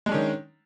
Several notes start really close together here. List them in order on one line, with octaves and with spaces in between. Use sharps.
G#3 D4 C#4 D#3